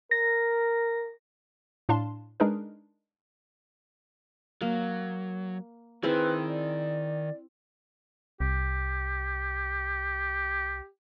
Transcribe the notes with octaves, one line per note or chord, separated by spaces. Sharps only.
A#4 A#6
A2 D4 F5 A5 C6
G#3 D4 D#4 G#4 A#4 B4
F#3 A#3
D#3 C4 E4 G#4 B4
D5
C2 G4